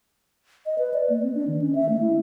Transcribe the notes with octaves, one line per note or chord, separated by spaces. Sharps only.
D#5
B4
D5
A#3
C4
D4
D#3
C#4
E5
A3
E4